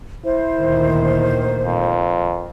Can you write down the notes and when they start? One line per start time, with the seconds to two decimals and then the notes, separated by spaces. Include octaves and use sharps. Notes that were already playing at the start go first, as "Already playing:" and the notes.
0.25 E4 C5
0.57 D2 A#2 D#3
1.65 F2